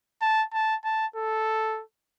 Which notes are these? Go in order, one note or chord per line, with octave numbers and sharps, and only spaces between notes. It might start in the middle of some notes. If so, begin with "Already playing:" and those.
A5
A5
A5
A4